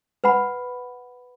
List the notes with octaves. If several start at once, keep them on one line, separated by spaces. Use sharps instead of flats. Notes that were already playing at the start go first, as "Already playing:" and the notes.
B4 F#5 B5